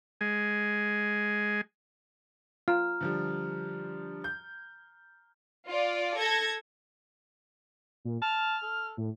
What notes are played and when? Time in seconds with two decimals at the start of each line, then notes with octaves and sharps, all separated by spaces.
0.21 G#3 G#5
2.68 F4 A#5 F6
3.01 D3 F3 G3
4.24 G6
5.66 F4 D5
6.18 A4 G#6 A#6
8.05 A#2
8.22 A5 F6
8.63 A4
8.97 A2